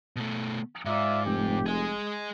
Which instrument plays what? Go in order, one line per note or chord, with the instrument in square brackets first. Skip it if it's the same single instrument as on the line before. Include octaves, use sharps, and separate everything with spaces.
[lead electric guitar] B2 A3
[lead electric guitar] G#2 [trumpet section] F4 D5 E5
[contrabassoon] F1 [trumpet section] G4
[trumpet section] G#3 [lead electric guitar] G#4 D#5